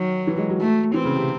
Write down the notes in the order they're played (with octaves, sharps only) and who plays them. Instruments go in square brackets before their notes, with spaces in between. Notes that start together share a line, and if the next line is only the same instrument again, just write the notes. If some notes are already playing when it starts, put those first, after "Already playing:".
Already playing: [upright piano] D#3 [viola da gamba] F#3
[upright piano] E3
G#3
F#3
[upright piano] F#3 [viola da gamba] A3
[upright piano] E3 [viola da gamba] C4
[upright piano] C#3
C3